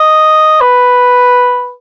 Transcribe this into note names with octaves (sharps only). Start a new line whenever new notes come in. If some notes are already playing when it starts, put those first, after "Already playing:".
Already playing: D#5
B4